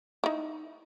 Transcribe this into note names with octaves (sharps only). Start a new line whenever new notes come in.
D#4 E4